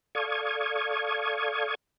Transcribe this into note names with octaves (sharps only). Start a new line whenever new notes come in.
A4 D5 F5 C#6 D#6 G#6